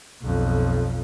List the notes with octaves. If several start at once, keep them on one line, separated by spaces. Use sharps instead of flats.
B1 F2